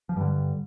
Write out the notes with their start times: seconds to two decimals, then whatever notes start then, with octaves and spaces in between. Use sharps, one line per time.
0.09 F3
0.17 G2 D3 G3